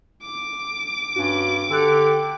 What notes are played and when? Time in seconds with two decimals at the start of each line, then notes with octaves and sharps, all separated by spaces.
0.22 D6
1.16 G2 C#4 F#4
1.70 D3 G4 E6 F#6 C#7